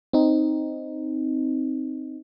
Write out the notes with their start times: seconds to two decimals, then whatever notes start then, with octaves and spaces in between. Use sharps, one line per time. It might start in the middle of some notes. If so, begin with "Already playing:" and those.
0.13 C4 D#4